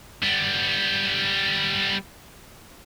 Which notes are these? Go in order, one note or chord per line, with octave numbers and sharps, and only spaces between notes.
G3 B3